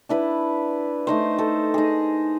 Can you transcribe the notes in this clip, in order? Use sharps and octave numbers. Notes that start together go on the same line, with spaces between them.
D4 E4 B4
A3 D#4 C5
A4
D#4 G#4